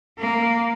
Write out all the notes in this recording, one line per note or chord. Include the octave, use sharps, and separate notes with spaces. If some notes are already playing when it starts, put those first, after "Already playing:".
A#3